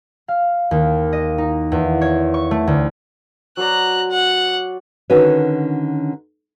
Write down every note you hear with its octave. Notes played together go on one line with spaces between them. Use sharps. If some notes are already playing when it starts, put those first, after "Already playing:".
F5
D#2
D#5
D#4
E2
C#5
C#6
A3
D2
F#3 C5 D5 A#5 F#6
F#5
D3 D#3 C#4 F#4 B4 C#5